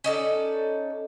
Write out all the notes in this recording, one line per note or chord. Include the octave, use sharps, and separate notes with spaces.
C#4 D#4 A4 D5